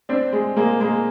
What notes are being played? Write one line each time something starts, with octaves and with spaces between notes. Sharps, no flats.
C4 D4
G#3
G#3 A#3
G#3 A#3